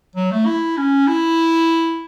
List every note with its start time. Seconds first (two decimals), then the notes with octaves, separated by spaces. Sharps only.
0.15 F#3
0.31 A3
0.46 E4
0.77 C#4
1.07 E4